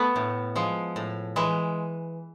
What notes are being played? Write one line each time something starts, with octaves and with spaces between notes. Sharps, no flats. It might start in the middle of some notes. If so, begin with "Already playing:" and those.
Already playing: A3 B3
A2
F3 G#3
A2
E3 G#3